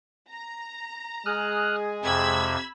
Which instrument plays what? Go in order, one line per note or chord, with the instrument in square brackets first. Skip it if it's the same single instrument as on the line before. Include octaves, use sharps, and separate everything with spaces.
[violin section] A#5
[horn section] G#3 G#4 [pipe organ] D#6 F6 F#6
[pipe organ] F2 C3 [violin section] B5 E6 G#6